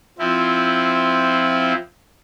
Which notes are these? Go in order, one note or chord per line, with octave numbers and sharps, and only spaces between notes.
F3 C4 E4